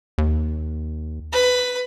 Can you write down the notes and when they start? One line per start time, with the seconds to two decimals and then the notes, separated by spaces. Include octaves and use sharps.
0.18 D#2
1.32 B4